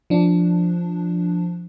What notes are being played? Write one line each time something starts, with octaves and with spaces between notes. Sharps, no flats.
F3 D4